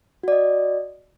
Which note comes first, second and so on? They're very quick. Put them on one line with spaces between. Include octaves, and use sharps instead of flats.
F#4 D5 D#5